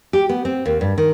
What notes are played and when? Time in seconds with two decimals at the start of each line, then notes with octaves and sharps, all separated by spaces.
0.13 G4
0.29 B3
0.45 C4
0.66 D#2
0.81 G2
0.98 D#3